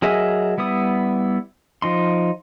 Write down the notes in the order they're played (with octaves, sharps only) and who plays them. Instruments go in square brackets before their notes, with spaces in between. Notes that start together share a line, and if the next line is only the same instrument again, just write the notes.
[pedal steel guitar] F#3 G#4 A#4 D#5 E5
G3 B3 E4 D#6
F3 D#4 C6